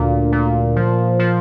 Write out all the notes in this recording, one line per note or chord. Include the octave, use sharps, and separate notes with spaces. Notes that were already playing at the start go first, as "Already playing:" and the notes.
Already playing: D2 A#2
A#2
F3
F3